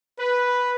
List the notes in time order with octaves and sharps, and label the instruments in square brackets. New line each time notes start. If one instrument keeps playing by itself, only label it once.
[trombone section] B4